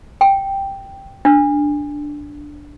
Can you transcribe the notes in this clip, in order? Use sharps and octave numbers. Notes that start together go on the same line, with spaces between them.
G5
D4